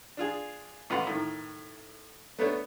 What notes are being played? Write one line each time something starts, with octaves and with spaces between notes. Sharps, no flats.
D4 F4 G#4
A1 F4 B4 F#5 C6
A2 D#3
A3 B3 D4 C#5